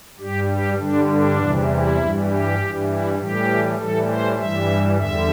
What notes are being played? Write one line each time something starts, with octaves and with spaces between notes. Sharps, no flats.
G2 G3 G4
G4
G2 D3 G3 D4
D4
E2 C3 E3 G3
E4
G2 E3 G3
G4
G2 E3 G3
E4
A2 E3 G3 G4
A2 E3 G3 A4
C5
G2 E3 G3 E5
E2 D3 G3 E5